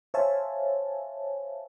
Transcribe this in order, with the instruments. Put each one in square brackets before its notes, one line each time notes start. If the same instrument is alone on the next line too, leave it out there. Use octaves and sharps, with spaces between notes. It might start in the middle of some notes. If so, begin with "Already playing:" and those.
[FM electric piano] C5 C#5 E5 F5 G#5 A5